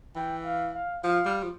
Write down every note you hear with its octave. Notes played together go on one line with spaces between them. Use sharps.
E3 G5
F5
F5
F3 F5
G3
F3